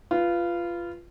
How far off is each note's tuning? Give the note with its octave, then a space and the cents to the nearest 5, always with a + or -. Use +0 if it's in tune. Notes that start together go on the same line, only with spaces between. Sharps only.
F4 -15 B4 +0